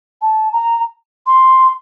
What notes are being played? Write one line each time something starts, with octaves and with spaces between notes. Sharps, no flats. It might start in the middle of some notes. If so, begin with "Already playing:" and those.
A5
A#5
C6